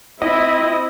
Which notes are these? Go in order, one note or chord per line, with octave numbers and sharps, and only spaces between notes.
C4 E4 D#5